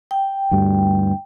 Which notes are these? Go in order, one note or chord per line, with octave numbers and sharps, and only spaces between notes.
G5
D2 G2 G3